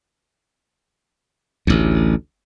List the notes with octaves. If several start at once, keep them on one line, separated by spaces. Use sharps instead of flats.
A1 D2